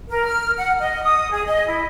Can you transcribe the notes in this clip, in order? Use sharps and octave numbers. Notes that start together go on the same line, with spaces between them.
A#4
F6
F#5
D#5
D#6
G#4
D#5
E4